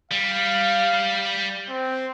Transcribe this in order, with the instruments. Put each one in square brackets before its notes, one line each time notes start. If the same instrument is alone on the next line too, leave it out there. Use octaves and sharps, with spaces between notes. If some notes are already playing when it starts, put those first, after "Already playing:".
[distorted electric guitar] G3 [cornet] F5
[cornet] C4